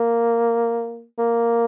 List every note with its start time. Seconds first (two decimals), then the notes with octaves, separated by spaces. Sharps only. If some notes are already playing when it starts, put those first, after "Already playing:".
Already playing: A#3
1.19 A#3